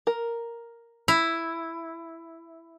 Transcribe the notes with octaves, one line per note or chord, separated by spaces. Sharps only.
A#4
E4